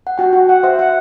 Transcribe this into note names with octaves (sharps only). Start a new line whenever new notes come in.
F#5
F#4 G5
F#4
F#5
C5 E5
F#5